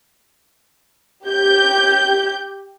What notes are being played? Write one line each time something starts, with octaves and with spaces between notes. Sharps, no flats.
G4 G6